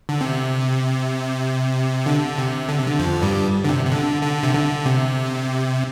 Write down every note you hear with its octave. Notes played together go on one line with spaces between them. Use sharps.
D3
C3
D3
C3
D3
C3
D3
F2 F3
G2 G3
D3
C3
C3
D3
D3
C3
D3
C3